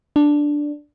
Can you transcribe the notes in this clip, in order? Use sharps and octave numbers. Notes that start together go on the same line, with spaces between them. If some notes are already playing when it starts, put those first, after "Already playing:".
D4